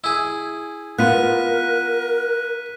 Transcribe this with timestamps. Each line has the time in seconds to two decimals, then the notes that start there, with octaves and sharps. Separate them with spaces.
0.04 E4 G#4
0.99 B3 F4 A#4 F#6 B6 D#7